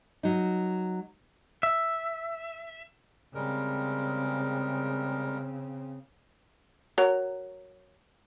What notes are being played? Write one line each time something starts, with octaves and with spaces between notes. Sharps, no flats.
F#3 D#4
E5
C#3 G3 G#3 C4 A#4
F#3 A#4 A#5